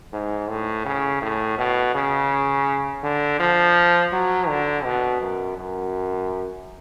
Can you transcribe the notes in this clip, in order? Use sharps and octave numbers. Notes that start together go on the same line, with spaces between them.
G#2
A2
C#3
A2
B2
C#3
D3
F3
F#3
D3
B2
F#2
F#2